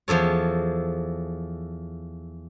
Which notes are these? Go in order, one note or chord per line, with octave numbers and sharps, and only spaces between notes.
E2 F3 A4 C#5